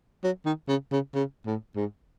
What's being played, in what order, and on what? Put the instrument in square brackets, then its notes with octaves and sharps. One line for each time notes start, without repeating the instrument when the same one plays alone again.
[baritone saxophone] F#3
D#3
C#3
C#3
C#3
A2
G#2